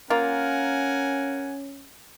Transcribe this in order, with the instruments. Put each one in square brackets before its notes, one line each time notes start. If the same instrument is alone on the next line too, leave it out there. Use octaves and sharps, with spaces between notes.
[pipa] A#3 F4 [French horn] C#4 [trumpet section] A#4 F#5 G#5